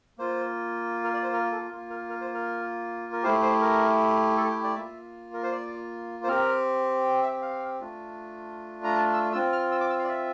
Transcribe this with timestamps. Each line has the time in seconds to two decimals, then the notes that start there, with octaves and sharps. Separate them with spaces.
0.18 A#3 F4 C5
1.04 A#4
1.14 D5
1.23 C5
1.33 A#4
1.52 A4
1.71 A#3 F4
1.90 A#4
2.09 A#4
2.21 C5
2.34 A#4
3.13 A#4
3.23 A3 E4 G4 C5
3.43 C5
3.61 A#4
4.37 A4
4.50 G5
4.64 D5
4.75 A#3 F4 E5
5.33 A#4
5.43 C5
5.52 D5
6.24 C5
6.28 C4 G4 A#4
7.23 E5
7.42 F5
7.81 A3 D4 F4
8.84 A#5
8.95 A5
9.13 E6
9.33 C4 F4 E6
9.52 F6
9.71 E6
9.81 D6
9.90 E6
9.99 F5
10.04 D5
10.09 E5